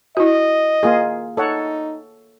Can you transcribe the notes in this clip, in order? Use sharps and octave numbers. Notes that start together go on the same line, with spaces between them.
E4 F#4 D#5
A#3 F4 G#4
D#4 A4 C#5 F#5